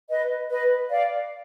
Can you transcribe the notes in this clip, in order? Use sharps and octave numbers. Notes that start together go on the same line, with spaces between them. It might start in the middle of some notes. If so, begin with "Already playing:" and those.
B4 D#5
B4 D#5
D5 F5